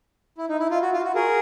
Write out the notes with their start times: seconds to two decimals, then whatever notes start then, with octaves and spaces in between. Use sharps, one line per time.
0.38 E4
0.49 D#4
0.59 E4
0.71 F4
0.82 F#4
0.94 F4
1.04 F#4
1.15 G#4 A#4